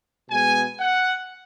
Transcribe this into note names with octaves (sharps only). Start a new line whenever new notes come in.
B2 G#3 B3 G#5
F#5